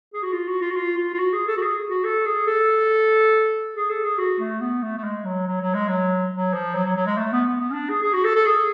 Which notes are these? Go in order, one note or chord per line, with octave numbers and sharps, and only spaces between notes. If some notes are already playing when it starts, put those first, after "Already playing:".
G#4
F#4
F4
F#4
F4
F#4
F4
F4
F4
F#4
G#4
A4
F#4
G#4
F#4
A4
G#4
A4
G#4
A4
G#4
F#4
A3
B3
A3
A3
G#3
F#3
F#3
F#3
G#3
F#3
F#3
F3
F#3
F#3
F#3
G#3
A3
B3
B3
B3
C#4
D4
G#4
G#4
F#4
A4
A4
G#4